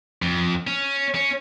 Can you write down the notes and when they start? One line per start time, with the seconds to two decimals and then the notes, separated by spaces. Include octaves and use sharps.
0.22 F2
0.67 C#4
1.15 C#4